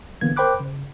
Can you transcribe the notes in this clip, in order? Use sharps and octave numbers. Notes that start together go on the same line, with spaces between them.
D3 E3 A#3 B3 G#6
A#4 C5 G5 B5 D6 F#6
C#3